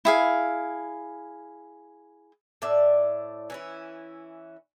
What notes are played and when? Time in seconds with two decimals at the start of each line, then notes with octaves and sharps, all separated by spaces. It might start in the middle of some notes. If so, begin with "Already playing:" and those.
0.05 E4 G#4 F5
2.62 A2 D5 E5
3.50 E3 C#4 E4